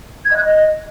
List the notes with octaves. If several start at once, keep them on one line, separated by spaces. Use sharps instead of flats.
G#6
D#5
F#6
D#5